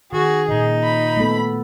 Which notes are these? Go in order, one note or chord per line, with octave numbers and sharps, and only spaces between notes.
D#3 F#4 G#4
A#2 C#3 D#4
B5
A3 B3 A4